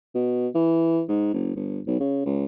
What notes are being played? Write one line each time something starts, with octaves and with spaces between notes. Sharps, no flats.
B2
E3
G#2
F#1
G1
B1
C#3
C#2